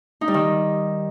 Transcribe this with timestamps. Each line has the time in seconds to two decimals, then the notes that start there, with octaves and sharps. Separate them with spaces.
0.21 D#4
0.28 G3
0.34 D#3